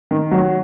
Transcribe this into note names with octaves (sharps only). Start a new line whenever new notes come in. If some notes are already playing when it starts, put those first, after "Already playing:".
D#3
F#3